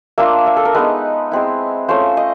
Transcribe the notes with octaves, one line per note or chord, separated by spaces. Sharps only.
A#3 D4 F4 E5
E5
A4
A#4
G#3 B3 D#4 B4
G#3 C4 E4
A3 C#4 F4 C5
D#5